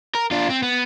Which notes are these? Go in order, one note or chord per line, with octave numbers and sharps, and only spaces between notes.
A#4
D4 F4
C4
B3